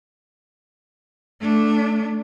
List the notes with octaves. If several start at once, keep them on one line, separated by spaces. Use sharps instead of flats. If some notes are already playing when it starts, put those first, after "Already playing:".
A3 D4